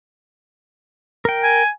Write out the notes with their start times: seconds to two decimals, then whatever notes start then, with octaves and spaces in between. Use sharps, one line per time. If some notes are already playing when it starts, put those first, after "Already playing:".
1.25 A#4 G5
1.43 G#5